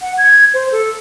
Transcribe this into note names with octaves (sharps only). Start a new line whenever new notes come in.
F#5
G#6
C5
A4